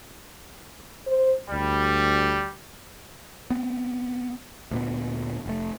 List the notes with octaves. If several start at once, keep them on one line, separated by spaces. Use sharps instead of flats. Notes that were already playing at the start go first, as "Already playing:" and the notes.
C5
D2 G3
B3 C4
D2 A#2 B3
F1 A3